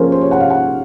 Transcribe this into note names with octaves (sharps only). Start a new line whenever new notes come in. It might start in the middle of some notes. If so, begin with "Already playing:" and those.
Already playing: F3 A#3 C#4 G#4 A#4 C5
C5
C#5
F#5
F5
F#5